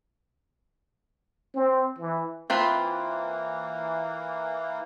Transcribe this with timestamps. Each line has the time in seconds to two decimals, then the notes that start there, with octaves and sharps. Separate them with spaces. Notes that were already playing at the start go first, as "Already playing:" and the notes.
1.54 C4
1.99 E3
2.50 E3 A#3 C4 F4 B4